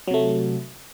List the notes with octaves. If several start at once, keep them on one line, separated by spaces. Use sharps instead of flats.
C3 F#3 A3